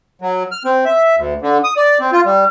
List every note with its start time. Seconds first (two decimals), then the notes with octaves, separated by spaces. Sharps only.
0.22 F#3
0.52 F6
0.65 C4
0.85 E5
1.17 D2
1.42 D3
1.64 D#6
1.77 D5
2.00 C4
2.12 F4
2.26 G3